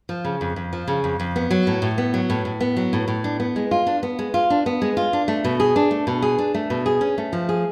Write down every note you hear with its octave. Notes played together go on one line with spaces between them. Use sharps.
F3
C#3
F2
F2
F3
C#3
F2
F2
B3
F#3
A2
A2
B3
F#3
A2
A2
B3
F#3
A2
A2
D4
B3
G#3
F4
D4
B3
G#3
F4
D4
B3
G#3
F4
D4
A3
B2
G#4
D4
A3
B2
G#4
D4
A3
B2
G#4
C#4
A3
F3
G#4